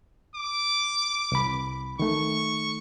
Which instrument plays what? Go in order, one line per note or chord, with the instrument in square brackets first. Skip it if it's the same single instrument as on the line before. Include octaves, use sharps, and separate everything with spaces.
[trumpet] D6
[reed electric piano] C2 B5
[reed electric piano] D#3 A3 [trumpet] C#6